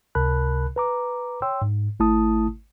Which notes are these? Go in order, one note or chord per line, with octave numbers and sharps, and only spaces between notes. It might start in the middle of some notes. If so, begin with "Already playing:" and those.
C#2 C3 A#4 A5 B5 F#6
B4 A#5 D6
C#5 G5 C6 E6
G#2
G#1 A3 E4 A5 D#6